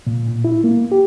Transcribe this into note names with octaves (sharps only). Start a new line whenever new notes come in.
A#2
A#2
E4
A#3
G4